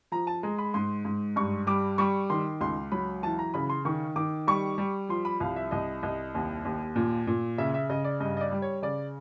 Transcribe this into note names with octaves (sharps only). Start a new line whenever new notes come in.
F3 A#5
A5
G#3 A#5
B5
G#2 C6
G#2
G2 C#6
G3 D6
G3 C#6
D#3 C6
C#2 C6
F#3 B5
E3 A5
A#5
C#3 B5
C6
D#3 C#6
D#3 D6
G3 C#6
G3
F3 C6
B5
C2 F5
E5
C2 D#5
C2 D#5
D#2
D#2
A#2
A#2
C#3 E5
E5
C#3 D#5
D5
G2 D#5
D#5
D5
G3
C#5
C#3 D5